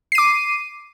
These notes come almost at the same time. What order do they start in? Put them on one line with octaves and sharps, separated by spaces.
C7 D#7 D6